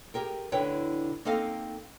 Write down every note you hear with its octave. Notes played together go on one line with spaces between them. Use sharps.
G4 G#4 A#4 G5
D2 D3 E4 B4 C#5 G5
A#3 C4 D#4 A4 D#5 F5